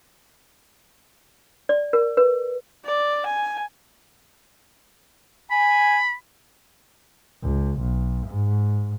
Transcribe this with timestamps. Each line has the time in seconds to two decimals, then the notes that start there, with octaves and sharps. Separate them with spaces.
1.69 D5
1.93 A#4
2.17 B4
2.85 D5
3.26 G#5
5.51 G#5 B5
7.43 C#2
7.80 B1
8.27 G#2